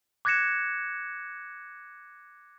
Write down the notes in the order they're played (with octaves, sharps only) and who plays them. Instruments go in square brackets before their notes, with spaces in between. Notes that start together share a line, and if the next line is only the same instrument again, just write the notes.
[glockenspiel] D6 F#6 G#6 A#6 C#7 E7